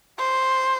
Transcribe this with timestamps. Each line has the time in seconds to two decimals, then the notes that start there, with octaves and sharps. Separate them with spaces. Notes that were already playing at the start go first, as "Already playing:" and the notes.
0.19 C5